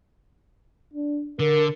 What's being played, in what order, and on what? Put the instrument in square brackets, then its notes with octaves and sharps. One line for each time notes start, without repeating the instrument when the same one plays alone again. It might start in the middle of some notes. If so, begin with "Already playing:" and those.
[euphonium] D4
[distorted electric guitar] D3 [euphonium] A#4